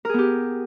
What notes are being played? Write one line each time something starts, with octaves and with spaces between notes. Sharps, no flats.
B3 G4 G#4 A#4